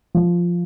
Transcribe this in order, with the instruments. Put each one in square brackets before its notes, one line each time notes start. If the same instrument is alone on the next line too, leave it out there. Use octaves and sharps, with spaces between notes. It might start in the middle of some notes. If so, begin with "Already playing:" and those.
[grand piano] F3